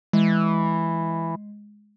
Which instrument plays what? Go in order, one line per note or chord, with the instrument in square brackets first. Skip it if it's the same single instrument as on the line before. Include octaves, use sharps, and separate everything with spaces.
[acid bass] E3 [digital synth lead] G#3